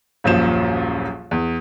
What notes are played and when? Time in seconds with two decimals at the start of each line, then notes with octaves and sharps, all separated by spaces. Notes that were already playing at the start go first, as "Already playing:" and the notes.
0.24 D#1 A#1 F#2 F3 E7
1.31 E2